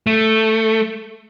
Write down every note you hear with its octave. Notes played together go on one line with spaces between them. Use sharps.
A3